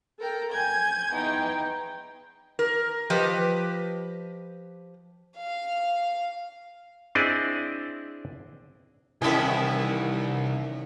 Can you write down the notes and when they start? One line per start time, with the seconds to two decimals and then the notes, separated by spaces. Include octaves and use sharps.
0.19 A4 A#4 G5
0.51 G#5 G6 G#6
1.13 E2 D#4 G5
2.59 A#4
3.10 F3 G4 B4 D#5
5.37 F5
7.15 C4 D4 E4 G#4 D5 D#5
9.22 C2 C3 D#3 E3 C#4 E4